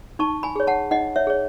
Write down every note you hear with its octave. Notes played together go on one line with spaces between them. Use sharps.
D#4 A5 C#6
G#5 B5
G#4 C#5
F#5 A5
D#4 D#5 F#5
C#5 E5
G#4 C#5